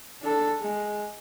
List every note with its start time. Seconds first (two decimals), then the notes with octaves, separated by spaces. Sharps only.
0.22 D4 A4
0.60 G#3